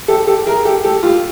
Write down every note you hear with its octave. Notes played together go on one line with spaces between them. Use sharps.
G4 A4
G4 A4
G#4 A#4
G4 A4
G4 A4
F4 G4